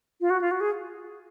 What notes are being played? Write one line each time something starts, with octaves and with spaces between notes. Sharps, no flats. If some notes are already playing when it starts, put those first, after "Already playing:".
F4
F#4
F4
F#4
G#4